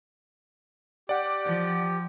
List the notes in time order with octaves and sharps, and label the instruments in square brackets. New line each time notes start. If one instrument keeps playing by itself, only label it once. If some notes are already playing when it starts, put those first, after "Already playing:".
[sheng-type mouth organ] G4 [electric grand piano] D5 F#5
[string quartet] F3